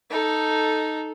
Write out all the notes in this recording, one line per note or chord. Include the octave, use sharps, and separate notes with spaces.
D#4 A4